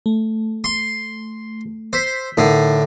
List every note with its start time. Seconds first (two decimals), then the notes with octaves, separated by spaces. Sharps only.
0.06 A3
0.64 C6
1.93 C5 E6 G6 B6
2.37 A2 D3 D#4 A4 A#4